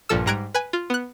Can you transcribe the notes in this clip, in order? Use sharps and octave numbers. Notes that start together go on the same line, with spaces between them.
A#1 G2 A#2 F3 A4 E6
G#2 G3 A#5 F#6 G#6 D7
B4 G#5
F4
B3 F#6